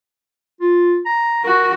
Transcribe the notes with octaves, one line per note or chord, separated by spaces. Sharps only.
F4
A#5
F#4 A#4